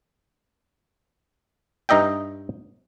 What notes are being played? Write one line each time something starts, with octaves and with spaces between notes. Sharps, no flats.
G2 D#4 D#5 E5 G5